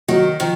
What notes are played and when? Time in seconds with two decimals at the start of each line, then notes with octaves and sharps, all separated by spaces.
0.09 D#3 F#3
0.40 D#3 F3